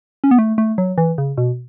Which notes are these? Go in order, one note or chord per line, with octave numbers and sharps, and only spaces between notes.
C#4
B3
A3
A3
F#3
E3
C#3
B2